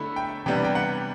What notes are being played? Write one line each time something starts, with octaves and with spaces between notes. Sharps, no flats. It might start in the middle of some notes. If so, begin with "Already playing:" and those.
Already playing: D3 A3 E4 B5
G5
C3 E3 G3 B3 D4 G5
G5
F#5